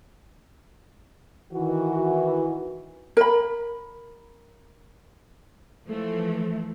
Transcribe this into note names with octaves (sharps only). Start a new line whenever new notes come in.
D#3 E3 F#4
A#4 B5
E3 F3 A3